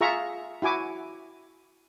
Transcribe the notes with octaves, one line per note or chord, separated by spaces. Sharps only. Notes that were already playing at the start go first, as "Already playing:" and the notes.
F4 G#4 E5 A#5 C#6
E4 F#4 G#5 D6